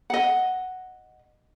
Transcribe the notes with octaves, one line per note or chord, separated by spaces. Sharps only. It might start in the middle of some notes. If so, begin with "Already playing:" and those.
D#5 F#5